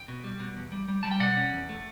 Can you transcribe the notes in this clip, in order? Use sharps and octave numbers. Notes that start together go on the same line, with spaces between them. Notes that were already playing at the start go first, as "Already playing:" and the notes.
Already playing: G5
B2
G3
B2
E2
G3
G3
G3 A5
G5
B2 D5 F#5
C#4
E2
A3